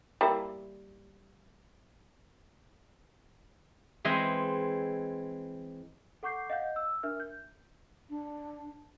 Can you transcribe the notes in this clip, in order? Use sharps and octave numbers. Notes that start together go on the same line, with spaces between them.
G3 A#3 E4
E3 G#3 C4 D#5
A4 F#5 C#6 D6 G6 C7
D#5 F5 F#5 G6
E6
D4 A#4 E5 F6
G6
D4